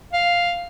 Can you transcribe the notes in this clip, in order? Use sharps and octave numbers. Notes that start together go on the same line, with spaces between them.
F5